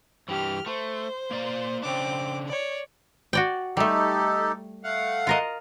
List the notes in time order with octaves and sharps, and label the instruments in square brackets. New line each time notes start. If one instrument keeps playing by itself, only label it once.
[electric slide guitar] G2 E3 [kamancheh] G4 F6
[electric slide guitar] A3 [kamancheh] C5
[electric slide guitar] A#3 D5 F5
[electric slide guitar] C#3 D4 [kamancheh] C4 D6
[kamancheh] C#5 D5
[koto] F#4 D5 G5
[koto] G3 A3 [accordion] D#4 G4 A4
[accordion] A3 F5 F#5
[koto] F4 A#4 D#5